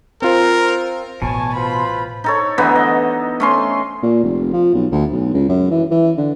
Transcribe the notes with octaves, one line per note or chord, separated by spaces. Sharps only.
C4 F4 A#4 C5
A1 B2 C#5 G#5 A5
F4 B4 C5 B5
D#4 A4 C#5
D3 E3 B3 D#4
D#5
A3 C#4 C6
A#2
F1
F3
B1
D2
B1
C#2
F#2
E3
E3
D3